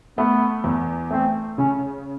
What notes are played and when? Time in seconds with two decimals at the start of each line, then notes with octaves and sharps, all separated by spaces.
0.18 A3 B3
0.64 E2
1.11 A3 C4
1.58 C#3 C#4